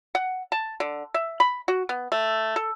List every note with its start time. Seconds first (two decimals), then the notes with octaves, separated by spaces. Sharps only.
0.15 F#5
0.52 A5
0.80 D3
1.14 E5
1.40 B5
1.68 F#4
1.89 B3
2.12 A3
2.56 A4